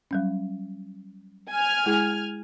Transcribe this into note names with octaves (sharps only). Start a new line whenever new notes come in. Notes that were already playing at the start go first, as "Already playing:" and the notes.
F#3 G3 C#4
G#5 F6
G#3 E4 G#4